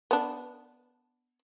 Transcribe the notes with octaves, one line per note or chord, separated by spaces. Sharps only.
B3 D4